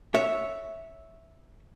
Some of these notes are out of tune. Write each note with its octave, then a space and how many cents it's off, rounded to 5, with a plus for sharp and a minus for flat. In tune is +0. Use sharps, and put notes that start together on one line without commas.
C#5 +0 E5 -5